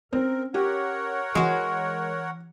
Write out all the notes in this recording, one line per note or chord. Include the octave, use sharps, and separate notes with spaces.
C4 C#4 A#4
G4 A#4 C#5 F#5
E3 G#3 F#4